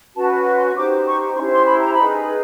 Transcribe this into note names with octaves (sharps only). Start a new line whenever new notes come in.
C#4 F#4 B4 A5
C#6
C6
C#6
D#4 G4 C5 D6
C#6
C#4 E4 G4 C5 C6
C6
B5
A#5
B5
D#4 G#4 B4